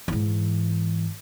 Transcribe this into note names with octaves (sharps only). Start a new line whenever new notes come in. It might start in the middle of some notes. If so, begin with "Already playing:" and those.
G#2 E3